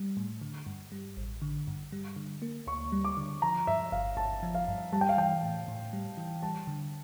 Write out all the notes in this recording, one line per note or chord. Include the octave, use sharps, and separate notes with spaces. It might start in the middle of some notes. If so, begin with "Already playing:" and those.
Already playing: G3
A2
D3
G2
G3
A1
D3
G2
G3
D3
A#3
D2 C#6
G3
D6
D3
F3 A#5
G2 E5
G1 F5
G1 A5
F3
F5
G2
G3 A5
G5
F5
E3 G5
A2
A2
G3
E3
G3 A5
D3